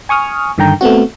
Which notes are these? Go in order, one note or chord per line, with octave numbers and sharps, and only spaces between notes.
G#5 C#6 D#6 F6
G2 D3 D#3 G5 A#5 G6
A3 B3 C4 F#4